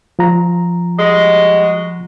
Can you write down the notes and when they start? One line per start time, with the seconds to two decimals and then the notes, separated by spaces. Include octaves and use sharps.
0.19 F3 F4 A#5
0.98 G3 G#3 F#4